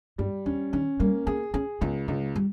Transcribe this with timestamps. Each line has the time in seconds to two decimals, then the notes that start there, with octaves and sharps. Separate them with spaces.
0.18 G2 G3
0.46 E2 C#4
0.73 D#3 C#4
1.00 G3 A#3
1.27 B3 G#4
1.54 C#4 G#4
1.81 C#2 B3
2.08 C#2 G#3
2.36 G3